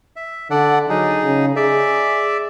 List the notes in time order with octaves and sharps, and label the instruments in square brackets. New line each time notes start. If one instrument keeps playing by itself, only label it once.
[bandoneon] E5
[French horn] D3 [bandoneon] A4 D5 F#5
[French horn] F#3 [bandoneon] D#4 G#4
[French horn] C#3
[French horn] G#4 [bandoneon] D5 E5